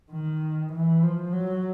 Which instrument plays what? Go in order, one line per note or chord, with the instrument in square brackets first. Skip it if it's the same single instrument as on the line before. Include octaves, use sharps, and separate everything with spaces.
[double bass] D#3
E3
F3
F#3